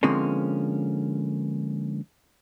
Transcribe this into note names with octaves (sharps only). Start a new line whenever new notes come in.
D3 F3 G#3 A#3 C4 C#4